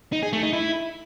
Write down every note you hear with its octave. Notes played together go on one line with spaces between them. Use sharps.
D#4
G#4
A3
D#4
E4